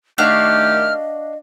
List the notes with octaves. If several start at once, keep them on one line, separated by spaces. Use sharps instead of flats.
D#3 A3 D4 F#4 G4 D#5 F5 F6